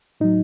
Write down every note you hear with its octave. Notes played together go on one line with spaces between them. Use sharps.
A2 F#3 D#4